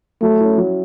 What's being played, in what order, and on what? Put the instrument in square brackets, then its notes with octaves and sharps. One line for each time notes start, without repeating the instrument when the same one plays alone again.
[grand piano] F#3 [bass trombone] A3
[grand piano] C#4 E4
F#3